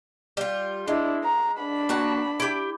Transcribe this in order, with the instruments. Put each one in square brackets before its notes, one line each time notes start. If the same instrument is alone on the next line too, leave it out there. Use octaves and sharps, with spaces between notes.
[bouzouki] G3 F4
[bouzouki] G#3 [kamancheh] D4 E4
[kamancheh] A#5
D4 B5
[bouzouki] A#3 F#4 A5
E4 G4